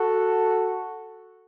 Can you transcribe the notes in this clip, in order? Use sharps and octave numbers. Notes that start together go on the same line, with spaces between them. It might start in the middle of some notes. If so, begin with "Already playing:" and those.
Already playing: F#4 A4